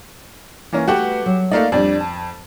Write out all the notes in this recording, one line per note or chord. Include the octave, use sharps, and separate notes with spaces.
E3 A#3 C#4
A3 F#4 G4 B4 F#5
F#3
A3 A#3 D#4 D5 F5
F2 G3 D4 D5
A5